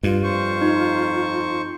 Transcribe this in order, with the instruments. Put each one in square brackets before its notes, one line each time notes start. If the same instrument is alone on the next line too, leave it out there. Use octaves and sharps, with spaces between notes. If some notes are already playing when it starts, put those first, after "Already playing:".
[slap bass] G2 [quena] F4
[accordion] F2 C5 C#6
[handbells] D#4